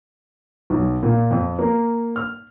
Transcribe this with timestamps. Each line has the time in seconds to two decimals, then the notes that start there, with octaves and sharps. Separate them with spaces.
0.70 B1
1.03 A#2
1.31 F2
1.59 A#3
2.16 F6